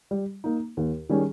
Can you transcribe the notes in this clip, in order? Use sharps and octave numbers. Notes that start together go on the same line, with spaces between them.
G3
A#3 D#4
D#2
D#3 G3 C#4 G#4